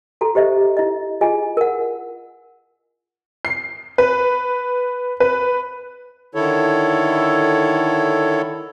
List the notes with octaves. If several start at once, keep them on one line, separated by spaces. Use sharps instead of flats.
F#4 A4 A#5
G4 C5 D#5 E5
E4 D#5
F4 G#4 D#5 G#5
A#4 F#5
C7
B4
B4
D3 D#3 E4 A4 C#5